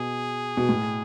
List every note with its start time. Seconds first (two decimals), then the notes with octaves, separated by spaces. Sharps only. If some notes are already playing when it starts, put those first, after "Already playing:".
Already playing: B2 G#4
0.57 B2
0.69 A2